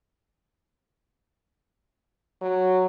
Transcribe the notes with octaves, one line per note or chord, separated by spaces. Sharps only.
F#3